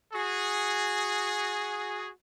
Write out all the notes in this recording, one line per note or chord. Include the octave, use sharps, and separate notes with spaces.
F#4 G#4